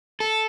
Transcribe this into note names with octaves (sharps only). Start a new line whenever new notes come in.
A4